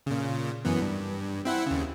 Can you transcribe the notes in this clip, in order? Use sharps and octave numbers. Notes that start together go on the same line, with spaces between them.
A#2 C#3
F#2 E3 B3
G2
C4 E4 F#5
D#2 C#3